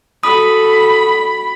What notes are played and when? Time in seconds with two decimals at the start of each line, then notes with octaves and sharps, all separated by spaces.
0.23 F#4 A4 B5 D#6